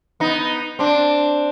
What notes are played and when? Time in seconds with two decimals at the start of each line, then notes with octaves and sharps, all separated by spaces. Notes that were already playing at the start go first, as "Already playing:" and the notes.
0.20 B3 D#4
0.79 C4 D4